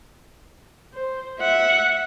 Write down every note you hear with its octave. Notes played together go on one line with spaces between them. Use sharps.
C5
E5 F#5